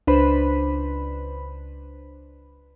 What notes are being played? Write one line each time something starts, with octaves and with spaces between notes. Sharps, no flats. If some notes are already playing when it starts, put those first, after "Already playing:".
C#2 D4 B4 C5 B5